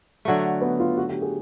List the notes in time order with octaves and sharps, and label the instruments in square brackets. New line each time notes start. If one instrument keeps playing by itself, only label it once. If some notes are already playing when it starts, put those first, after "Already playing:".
[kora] D3 F#3 A3
[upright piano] B3
F4
F#4
G4
G#4